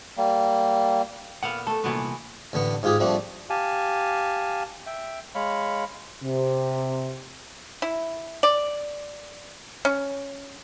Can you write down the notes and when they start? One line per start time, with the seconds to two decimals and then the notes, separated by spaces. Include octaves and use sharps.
0.18 G3 A#3
1.43 A#2 B3 F5 F#5
1.67 A3 A4
1.84 C2 A#2 E3 B3 F#4
2.53 A1 D3 B3 C#6
2.83 G#2 F4 G4 G#4
3.00 F3 G3 A3 C4 D4
3.50 G4 F5 G#5 A5
4.86 E5 G5
5.35 G#3 C#5 F5 B5
6.23 C3
7.82 E4
8.43 D5
9.85 C#4